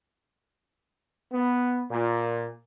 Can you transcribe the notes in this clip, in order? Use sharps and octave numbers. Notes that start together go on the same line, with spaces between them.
B3
A#2